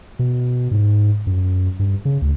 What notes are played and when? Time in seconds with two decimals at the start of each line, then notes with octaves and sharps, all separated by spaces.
0.19 B2
0.71 G#2
1.27 F#2
1.79 G2
2.05 C#3
2.22 D2